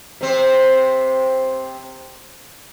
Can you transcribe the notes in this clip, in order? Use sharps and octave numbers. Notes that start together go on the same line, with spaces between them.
C3 C4